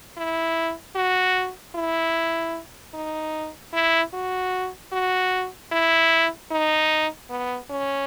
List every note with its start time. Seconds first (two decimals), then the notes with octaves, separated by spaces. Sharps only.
0.17 E4
0.95 F#4
1.75 E4
2.94 D#4
3.74 E4
4.13 F#4
4.92 F#4
5.72 E4
6.52 D#4
7.30 B3
7.71 C#4